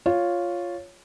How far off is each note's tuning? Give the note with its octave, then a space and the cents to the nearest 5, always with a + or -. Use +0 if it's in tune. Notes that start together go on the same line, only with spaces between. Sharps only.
F4 +0 C#5 +0